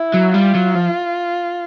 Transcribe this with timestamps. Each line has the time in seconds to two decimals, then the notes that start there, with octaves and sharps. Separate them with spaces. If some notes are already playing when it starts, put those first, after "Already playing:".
Already playing: E4
0.14 F#3
0.34 G3 F4
0.55 F#3
0.75 F3